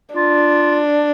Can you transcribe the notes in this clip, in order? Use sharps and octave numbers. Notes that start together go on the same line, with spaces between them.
D4 F4